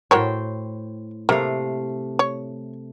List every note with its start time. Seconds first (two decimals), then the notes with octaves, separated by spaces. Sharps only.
0.11 A2 F#4 A#4 C5 C#5 G5
1.29 C3 A3 A#3 F5
2.19 C#5